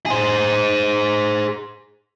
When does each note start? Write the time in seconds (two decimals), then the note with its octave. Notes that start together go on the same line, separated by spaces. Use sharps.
0.06 G#4 C5